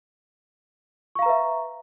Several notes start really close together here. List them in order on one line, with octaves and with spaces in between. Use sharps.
C#6 F5 A#5 B4 E5